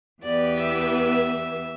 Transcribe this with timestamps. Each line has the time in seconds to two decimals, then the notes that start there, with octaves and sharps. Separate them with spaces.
0.22 E2 E3 B3 G4 B4 D5
0.56 E5